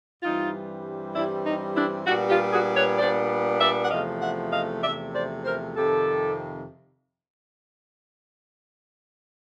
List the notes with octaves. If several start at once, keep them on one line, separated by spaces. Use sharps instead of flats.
G2 E3 G3 C4 D#4 F4
G2 E3 G3 C4 D4 E4
D#4
D4 E4
A#2 G3 B3 D4 E4 F#4
F4 G4
F#4 G#4
B4 C#5
A#2 G3 B3 D4 C5 D5
D5 E5
F#5
E2 C3 F3 A3 D#5 F5
E5 F#5
D#5 F5
E2 C3 F3 A3 D5 E5
C5 D5
A#4 C5
F2 C3 D#3 G4 A4